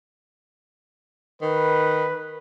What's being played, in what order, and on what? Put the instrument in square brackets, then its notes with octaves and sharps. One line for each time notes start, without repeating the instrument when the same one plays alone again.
[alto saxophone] D#3 [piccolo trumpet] B4